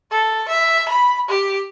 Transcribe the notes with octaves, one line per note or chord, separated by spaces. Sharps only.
A4
E5
B5
G4